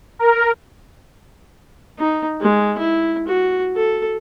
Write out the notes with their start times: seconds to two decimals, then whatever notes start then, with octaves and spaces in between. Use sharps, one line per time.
0.19 A#4
1.99 D#4
2.41 G#3
2.78 E4
3.28 F#4
3.76 A4